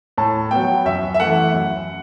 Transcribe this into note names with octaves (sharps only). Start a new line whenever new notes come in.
A2 A5
F#3 B3 G5
F#2 E5
E5
E3 A3 F#5
F#2